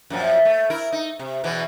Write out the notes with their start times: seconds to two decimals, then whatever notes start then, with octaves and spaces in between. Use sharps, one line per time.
0.10 F#2 A#2 F3
0.45 A3
0.70 E4 A#4
0.92 D#4
1.19 C3
1.44 E2 B2 E3